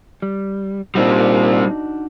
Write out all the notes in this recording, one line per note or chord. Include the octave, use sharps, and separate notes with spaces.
G3
A#2 G3 C4 D4 D#4 F#4